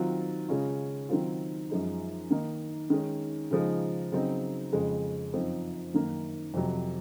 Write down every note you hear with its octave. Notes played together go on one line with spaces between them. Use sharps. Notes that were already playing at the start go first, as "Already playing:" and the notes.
Already playing: D#3 F#3 C4 F4
C#3 G#3 C#4 F4
D#3 F#3 C4 F4
F#2 F3 G#3 D#4
D#3 A#3 D#4
D#3 G#3 C#4
C#3 F3 G#3 D#4
C#3 F#3 C4 D#4
F2 C#3 G#3
F#2 F3 C4 D#4
F#2 D#3 A#3
F2 C3 F#3